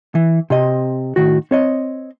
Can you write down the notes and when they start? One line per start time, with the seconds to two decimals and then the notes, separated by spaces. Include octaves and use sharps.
0.15 E3
0.50 C3 C4 D#5
1.16 A2 D#3 F#4
1.51 C4 C#5 D#5